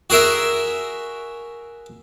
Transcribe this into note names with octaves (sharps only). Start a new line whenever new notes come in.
F#4 G#4 A#4 E5